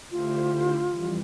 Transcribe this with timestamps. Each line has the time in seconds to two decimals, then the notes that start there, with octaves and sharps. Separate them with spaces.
0.11 D3 A3 E4 F4 G4 C5
0.90 F2 E3 G3